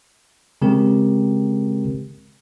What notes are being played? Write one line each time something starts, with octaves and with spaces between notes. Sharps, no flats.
C#3 G#3 C4 G4 A#4